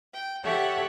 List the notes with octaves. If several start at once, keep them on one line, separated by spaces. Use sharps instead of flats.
G5
G4 A4 C#5 E5 F#5